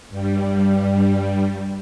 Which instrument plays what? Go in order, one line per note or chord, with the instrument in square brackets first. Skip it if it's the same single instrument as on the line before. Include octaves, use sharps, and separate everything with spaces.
[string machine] G2 G3